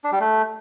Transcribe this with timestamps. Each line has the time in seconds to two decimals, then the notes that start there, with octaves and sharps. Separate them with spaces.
0.04 D4
0.12 G3
0.20 A3